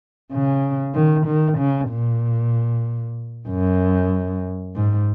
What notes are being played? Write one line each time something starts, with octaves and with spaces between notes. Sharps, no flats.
C#3
D#3
D#3
C#3
A#2
F#2
G#2